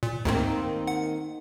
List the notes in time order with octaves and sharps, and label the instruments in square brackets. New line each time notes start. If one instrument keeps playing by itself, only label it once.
[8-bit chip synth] A#2
[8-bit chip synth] D2 G#2 [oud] D#3 A#3 C4
[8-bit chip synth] F#5